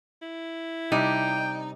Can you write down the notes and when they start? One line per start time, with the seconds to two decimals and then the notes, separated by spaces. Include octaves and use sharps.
0.22 E4
0.92 C3 G3 D4 D#4 G5